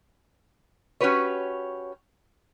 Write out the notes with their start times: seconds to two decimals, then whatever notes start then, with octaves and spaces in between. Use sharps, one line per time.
1.01 C#4 F#4 G4 B4 C#5